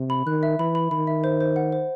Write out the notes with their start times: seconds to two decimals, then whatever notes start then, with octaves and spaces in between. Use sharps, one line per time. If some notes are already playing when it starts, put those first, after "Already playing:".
Already playing: C3
0.10 B5
0.26 D#3 F#6
0.43 E5
0.59 E3 B5
0.75 B5
0.91 D#3 B5
1.07 E5
1.24 C5
1.41 C5
1.56 F#5
1.72 C5